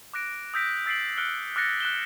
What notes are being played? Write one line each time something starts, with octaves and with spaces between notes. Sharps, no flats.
D6 F#6 A#6 D7
D#6 E6 G6 A#6 B6 D7
E6 A6 B6 C7 D7 F#7
F6 F#6 C#7 D7 G7
D6 F6 F#6 A6 A#6 C#7
F#6 E7 G7